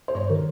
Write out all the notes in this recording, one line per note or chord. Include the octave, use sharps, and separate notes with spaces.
C5
G2 C#5
D#3 A#4